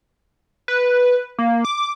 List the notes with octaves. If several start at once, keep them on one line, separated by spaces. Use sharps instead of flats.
B4
A#3
D6